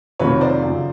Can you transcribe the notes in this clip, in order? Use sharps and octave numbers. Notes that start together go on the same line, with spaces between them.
F2 C3 D#3 F#3 A#3 B4 C#5
C5 D5
F#2 C#3 F3